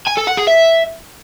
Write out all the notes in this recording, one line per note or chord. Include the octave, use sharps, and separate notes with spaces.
G#5
A4
F#5
G#4
E5